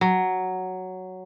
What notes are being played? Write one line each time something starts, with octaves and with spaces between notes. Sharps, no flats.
F#3